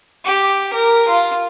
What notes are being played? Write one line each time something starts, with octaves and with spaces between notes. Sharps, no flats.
G4
A#4
F4